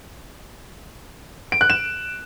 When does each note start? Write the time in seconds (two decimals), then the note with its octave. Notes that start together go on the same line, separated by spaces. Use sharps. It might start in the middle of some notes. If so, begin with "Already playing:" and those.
1.52 D7
1.61 F#6
1.70 E7